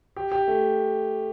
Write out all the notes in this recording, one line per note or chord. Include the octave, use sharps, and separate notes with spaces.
G4
G4
A3